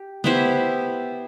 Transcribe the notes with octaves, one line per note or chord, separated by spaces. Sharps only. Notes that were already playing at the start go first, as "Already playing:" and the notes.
Already playing: G4
B3 E4 G4 C5